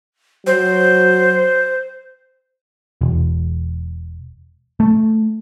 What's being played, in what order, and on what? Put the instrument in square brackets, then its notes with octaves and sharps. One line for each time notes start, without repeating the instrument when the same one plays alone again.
[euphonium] F#3 [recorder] C5
[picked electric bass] E1
A3